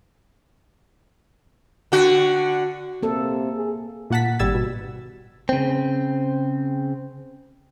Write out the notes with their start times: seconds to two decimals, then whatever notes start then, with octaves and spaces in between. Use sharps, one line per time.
1.92 D3 F#4
3.03 C3 A#3 A4
3.53 G#4
4.10 A#2 A#3 F#5 A5 B6
4.39 G#1 G3 E6 G#6 A6
4.55 B2
5.49 C#3 C4